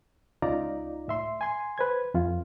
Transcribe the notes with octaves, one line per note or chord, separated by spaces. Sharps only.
C#2 D#4 F4 D5 A#5
A2 E5 C6
G#5 C6
B4 C5 G#6
F2 F4